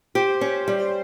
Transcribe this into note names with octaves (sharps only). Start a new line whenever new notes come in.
G4 C5
C#4
G3